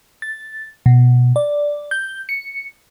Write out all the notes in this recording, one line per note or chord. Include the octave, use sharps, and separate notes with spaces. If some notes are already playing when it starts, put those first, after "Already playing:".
A6
B2
D5
G6
C#7